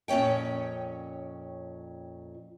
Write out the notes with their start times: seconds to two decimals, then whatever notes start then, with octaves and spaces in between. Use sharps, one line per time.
0.08 F2 A#2 C#4 C#5 G5